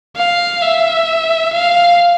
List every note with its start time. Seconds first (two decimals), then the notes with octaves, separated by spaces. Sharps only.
0.16 F5
0.62 E5
1.52 F5